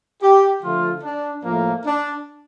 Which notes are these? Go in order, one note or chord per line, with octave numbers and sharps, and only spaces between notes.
G4
D3 F3 A3 F4
D4
A2 F3 A3 A#3
D4